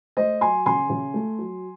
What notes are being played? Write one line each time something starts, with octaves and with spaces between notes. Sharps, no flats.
A3 C5 D#5
F#3 G#5 C6
C#3 G#5 C6
C#3
A3
F#3